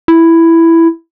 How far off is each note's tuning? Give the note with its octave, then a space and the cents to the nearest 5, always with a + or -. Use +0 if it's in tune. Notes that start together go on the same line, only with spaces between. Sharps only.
E4 +5